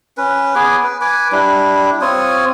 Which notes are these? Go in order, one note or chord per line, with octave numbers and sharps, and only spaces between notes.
C#4 B4
B3 G#4 G#5 D6
B4
B4 G#5 D6
G3 D4 E4
C4 F4 C#5 D#6